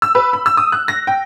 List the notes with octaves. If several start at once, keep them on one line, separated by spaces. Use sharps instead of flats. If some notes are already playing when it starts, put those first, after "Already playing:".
E6
B4
B5
E6
D#6
F#6
A#6
G5